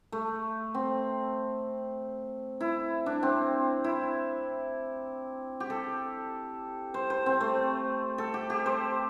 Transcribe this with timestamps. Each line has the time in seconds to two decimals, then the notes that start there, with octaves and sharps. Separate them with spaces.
0.12 A3
0.74 C4
2.61 E4
3.06 D4
3.23 C4
3.84 E4
5.60 G4
5.70 A4
6.94 C5
7.10 C5
7.26 C4
7.41 A3
8.18 A4
8.34 G4
8.50 G4
8.66 C5